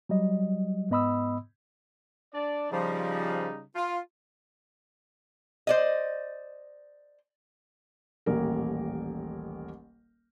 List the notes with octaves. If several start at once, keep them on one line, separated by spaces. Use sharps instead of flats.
F#3 G3 D#5
G#2 B3 D#5 B5 D#6 E6
D4 D5
C#3 F3 G3 D#4
F4
C5 D5 D#5
D#1 A1 A#3 A#4